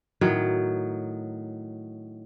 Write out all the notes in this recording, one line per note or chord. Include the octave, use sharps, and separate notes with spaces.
A2 D#3 F#3